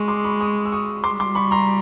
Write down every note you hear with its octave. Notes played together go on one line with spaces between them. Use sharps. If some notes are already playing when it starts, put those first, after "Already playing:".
Already playing: G#3 C#6 D#6
C6 D6
B5 C#6
C#6 D#6
E6
C#6 D#6
G3 C6 D6
C6 D6
B5 C#6
A#5 C6